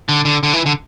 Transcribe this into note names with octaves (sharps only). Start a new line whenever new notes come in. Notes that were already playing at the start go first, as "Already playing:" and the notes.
D3
D3
D3
E3
D3